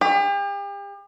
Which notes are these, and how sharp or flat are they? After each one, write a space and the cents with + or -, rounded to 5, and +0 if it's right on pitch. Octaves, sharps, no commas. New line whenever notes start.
G4 +40